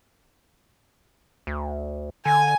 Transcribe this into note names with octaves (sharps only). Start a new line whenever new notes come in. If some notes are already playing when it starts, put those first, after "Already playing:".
D2
D3 G#5